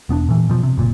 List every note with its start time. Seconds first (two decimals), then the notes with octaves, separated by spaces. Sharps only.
0.09 E1 B3 C#4 D4
0.29 A#2 E3
0.50 B2 F3
0.63 C3
0.78 F#1 A#2